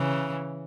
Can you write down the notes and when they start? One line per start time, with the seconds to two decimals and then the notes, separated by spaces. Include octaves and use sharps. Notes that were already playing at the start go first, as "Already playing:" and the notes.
Already playing: C#3 E3